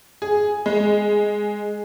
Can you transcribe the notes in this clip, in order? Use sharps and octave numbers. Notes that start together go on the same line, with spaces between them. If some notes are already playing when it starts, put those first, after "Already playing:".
G#4
G#3